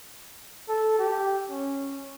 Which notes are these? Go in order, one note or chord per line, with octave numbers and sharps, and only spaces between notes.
A4
G4
C#4